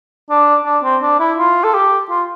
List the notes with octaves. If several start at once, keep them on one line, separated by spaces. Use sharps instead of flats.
D4
D4
C4
D4
E4
F4
A4
G4
F4